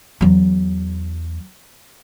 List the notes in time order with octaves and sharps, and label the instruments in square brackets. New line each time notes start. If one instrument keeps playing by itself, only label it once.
[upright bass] E2 F#3